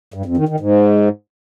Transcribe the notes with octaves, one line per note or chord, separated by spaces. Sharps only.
G2
F2
D#3
D#3
G#2